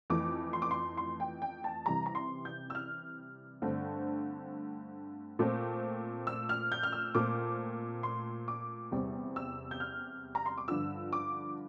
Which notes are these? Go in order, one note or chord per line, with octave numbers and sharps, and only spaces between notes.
F2 E3 A3 D6
C6
D6
C6
C6
G5
G5
A5
C3 E3 G3 A#5
A#5
C6
G6
E6
F6
G2 D3 A3 C4
A#2 A3 C4
E6
F6
G6
F6
E6
A#2 A3 C4 D6
C6
D6
E2 C3 G3 C4
E6
G6
F6
A#5
C6
D6
G2 D3 F3 E6
D6